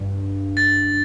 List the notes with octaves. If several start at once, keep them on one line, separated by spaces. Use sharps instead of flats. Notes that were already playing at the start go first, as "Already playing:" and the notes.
Already playing: G2
A6